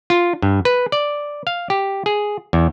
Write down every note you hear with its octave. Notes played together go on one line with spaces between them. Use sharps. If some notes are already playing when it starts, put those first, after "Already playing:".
F4
G2
B4
D5
F5
G4
G#4
E2